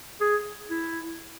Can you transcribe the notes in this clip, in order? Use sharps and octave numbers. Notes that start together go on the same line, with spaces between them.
G#4
E4